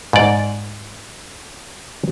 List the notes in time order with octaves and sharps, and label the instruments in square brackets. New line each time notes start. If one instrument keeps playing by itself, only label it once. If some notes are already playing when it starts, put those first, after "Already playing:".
[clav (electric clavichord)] G#2 D5